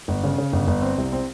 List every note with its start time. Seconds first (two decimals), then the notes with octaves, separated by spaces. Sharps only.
0.08 G1
0.24 C#3
0.38 C#3
0.53 G1
0.67 G1
0.82 C4
0.98 C2
1.12 C4